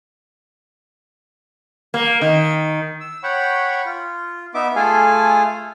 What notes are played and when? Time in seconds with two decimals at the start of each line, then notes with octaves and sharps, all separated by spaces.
1.94 A#3
2.21 D#3
3.00 E6
3.23 C#5 F#5 G5 B5 C#6
3.85 F4
4.54 B3 D#4 E5 D6
4.76 A3 F4 G#4 A4 F5 G#5